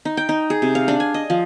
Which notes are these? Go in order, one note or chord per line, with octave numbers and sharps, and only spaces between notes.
D#4
G5
D#4
G#4
C3
F5
D4
G#5
D#5
F3